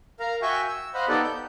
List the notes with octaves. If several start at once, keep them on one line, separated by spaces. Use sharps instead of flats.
A#4 F5 A#5
F#4 E5 G5 G#5 C#6 G6
E6
C5 D#5 F5 F#5 B5
B3 D#4 G4 A4 D5 F#5
G6